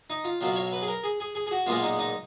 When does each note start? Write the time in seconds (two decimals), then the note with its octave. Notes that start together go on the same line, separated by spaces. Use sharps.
0.10 D#4
0.24 F4
0.41 B1 B2 F#3 F4
0.56 C#5
0.72 B4
0.82 G#4
0.88 A#4
1.04 G#4
1.20 G#4
1.35 G#4
1.47 G#4
1.51 F#4
1.66 B1 A#2 G#3 B3 F4
1.83 D#4
1.99 D#4